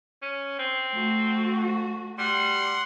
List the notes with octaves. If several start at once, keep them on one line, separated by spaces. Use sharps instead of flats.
C#4
C4
A3 F#4
G3 F#5 C6